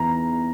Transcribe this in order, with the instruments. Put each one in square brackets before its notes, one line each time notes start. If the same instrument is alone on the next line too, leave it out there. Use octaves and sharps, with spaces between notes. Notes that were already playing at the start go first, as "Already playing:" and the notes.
Already playing: [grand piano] E2 E3 A#5